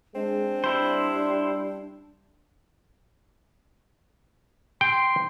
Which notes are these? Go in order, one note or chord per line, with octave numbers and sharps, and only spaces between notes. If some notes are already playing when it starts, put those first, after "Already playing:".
G#3 C4 D4
G3 E4 C5
G5 C6